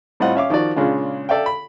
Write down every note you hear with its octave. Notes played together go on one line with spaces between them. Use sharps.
A2 G3 C4 F4 D#5 F#5
C#4 E5 F5 D6
D#3 F3 F#4 D5
A#2 C#3 G#3 C#4 D4 F4
A4 D5 E5 F5 G5
B5